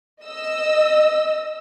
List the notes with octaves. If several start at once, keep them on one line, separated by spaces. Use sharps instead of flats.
D#5 E6